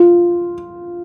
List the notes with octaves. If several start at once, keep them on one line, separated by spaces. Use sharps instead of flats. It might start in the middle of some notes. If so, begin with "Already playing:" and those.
Already playing: F4